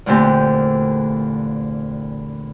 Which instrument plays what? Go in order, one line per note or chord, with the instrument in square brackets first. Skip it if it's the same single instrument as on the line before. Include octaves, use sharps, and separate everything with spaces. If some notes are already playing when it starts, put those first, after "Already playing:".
[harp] E2 A#2 D3 A3 C4 G4